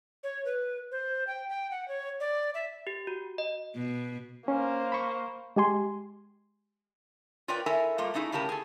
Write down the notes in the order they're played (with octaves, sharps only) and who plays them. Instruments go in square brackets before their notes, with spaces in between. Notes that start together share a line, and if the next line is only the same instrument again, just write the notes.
[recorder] C#5
B4
C5
G5
G5
F#5
C#5
D5
E5
[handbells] G4
F#4
D#5
[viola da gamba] B2
[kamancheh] A#3 C5 [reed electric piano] C#4
[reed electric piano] B5 C#6
[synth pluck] G#3 G4 G#5 C6
[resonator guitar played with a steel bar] F4 A#4 B4 C#5 D5 G5
E4 A4 A#4 E5 G#5
G3 A3 A#3 F4
A3 C#4 D#4 E4 G#4
A2 C#3 C#4 G4 A#4 A5
G#4 A4